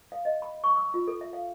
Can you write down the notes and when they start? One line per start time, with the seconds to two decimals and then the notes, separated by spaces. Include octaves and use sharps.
0.12 F5
0.25 D#5
0.42 B5
0.64 C#6
0.76 E6
0.94 F4
1.08 A4
1.21 E5
1.33 F5